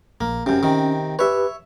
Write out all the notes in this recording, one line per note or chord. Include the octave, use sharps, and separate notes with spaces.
A#1 A#3
F#2 C3 C#4
C3 D#3
G4 B4 C#5 E5